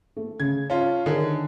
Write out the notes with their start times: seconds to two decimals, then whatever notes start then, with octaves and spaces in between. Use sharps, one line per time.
0.16 A3
0.40 C#3 G#6
0.70 C#4 F4 A5
1.06 D3 D#3 G#4 A#4